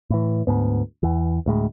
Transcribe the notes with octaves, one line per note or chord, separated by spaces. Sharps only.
A2 E3
D2 G#2 B3
E2 E3
D2 A2 G#3